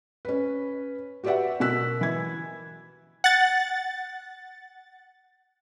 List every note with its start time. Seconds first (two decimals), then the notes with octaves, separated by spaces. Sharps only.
0.25 C#4 B4
1.24 F#4 G4 B4 D5 E5 F#5
1.60 B2 F#4 A#4 E6 F#6 B6
2.01 E3 G#6
3.24 F#5 A6